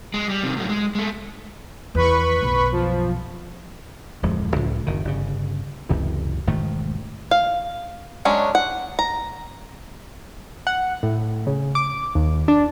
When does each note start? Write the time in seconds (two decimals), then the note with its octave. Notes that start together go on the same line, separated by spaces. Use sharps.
0.14 G#3
0.29 G3
0.43 C3 D#3
0.57 A2 F#3
0.69 G#3
0.95 G#3 A3
1.95 E2 D#3 B4 B5 C#6
2.42 B1 F#2
2.72 F3
4.22 D1 F2 F3 G#3
4.56 C#2 A2 F3
4.87 F#1 D#3
5.05 G1 C#3
5.89 F#1 C#2 C3 E3
6.46 E1 G#2 D#3 A3
7.31 F5
8.25 F#3 G#3 C#4 D4
8.55 F#5
8.99 A#5
10.67 F#5
11.03 A2
11.47 C#3
11.75 D6
12.15 D#2
12.48 D4